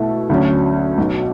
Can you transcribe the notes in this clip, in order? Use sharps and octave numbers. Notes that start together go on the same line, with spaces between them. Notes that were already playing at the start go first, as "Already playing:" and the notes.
Already playing: B2 A3 E4 A4 E5
D2 D3 F#3 C#4
B1 B2 F#3